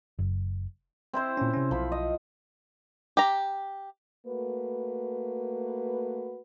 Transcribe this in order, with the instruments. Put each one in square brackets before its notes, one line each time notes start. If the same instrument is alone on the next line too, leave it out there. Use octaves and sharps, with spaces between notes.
[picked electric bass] F#1
[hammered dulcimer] C4 E4 C5
[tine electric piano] A#2 C#4
C3 C#4
[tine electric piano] B1 [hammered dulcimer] F3 B5
[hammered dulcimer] D#5
[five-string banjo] G4 A#5
[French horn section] A3 A#3 F#4 B4